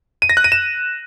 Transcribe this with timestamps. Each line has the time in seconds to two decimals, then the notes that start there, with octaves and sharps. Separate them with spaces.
0.22 D#7
0.29 A#6
0.37 F#6
0.44 D#7
0.52 E7